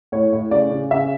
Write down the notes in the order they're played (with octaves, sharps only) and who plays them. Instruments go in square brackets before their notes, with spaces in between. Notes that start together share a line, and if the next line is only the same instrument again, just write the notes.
[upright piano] A2 C#5
A2
C#3 D5
C#3
C#3 E5